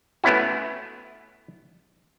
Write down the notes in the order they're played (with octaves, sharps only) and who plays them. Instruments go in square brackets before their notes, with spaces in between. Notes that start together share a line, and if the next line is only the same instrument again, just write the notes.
[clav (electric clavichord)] A3 B3 C#4 E4 F#4